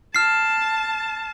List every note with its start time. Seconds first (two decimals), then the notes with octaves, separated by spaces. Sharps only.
0.15 A5 F6 C7